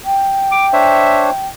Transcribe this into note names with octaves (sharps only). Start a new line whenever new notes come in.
G5
D6
D4 C5 C#5 E5